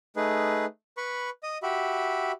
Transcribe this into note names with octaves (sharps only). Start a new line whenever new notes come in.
A3 D#4 G#4 B4
B4 B5 C#6
D#5 D#6
F#4 G4 E5 B5